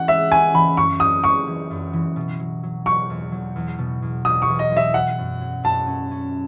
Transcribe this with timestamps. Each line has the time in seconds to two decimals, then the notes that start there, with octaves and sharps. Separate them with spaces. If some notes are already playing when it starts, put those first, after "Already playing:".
Already playing: E3 C#4 F#5
0.08 G#3 E5
0.32 C#4 G#5
0.54 E3 B5
0.77 F#2 C#6
1.00 F#2 D#6
1.24 G#3 C#6
1.47 E3
1.70 F#2
1.93 E3
2.16 B2
2.39 F#3
2.63 F#3
2.86 F#3 C#6
3.10 E2
3.32 F#3
3.56 E2
3.78 B2
4.02 E2
4.25 E2 D#6
4.42 C#6
4.48 E2
4.59 D#5
4.71 F#3
4.77 E5
4.94 F#3 F#5
5.18 F#2
5.41 F#3
5.63 F#2 A5
5.87 C#4
6.11 C#4